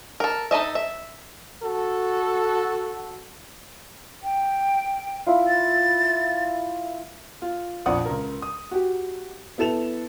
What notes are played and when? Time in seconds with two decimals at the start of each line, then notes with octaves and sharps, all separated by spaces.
0.20 A4 A#4
0.51 D#4 A4 D#5 E5
0.75 E5
1.63 F#4 A4
4.23 G5
5.27 E4 F4
5.48 A6
7.42 F4
7.86 A#1 F2 D5 F#5 D#6
8.05 C#2 A#4
8.42 D#6
8.71 F#4 G4
9.58 B3 E4 A4 E7 F7